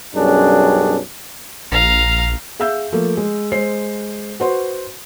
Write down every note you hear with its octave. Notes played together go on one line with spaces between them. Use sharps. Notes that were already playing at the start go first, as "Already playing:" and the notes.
B1 F#2 G3 C#4 D4 G#4
A#1 F5 A#5
G#4 E5 F5 E6 G6
F3 A3 A#3
G#3
G#3 C5 C7
F#4 B4 C5 C6